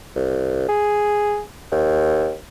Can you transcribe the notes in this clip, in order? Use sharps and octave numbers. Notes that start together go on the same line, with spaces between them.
C2
G#4
D#2